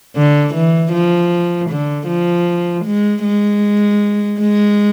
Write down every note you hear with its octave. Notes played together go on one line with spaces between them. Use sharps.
D3
E3
F3
D3
F3
G#3
G#3
G#3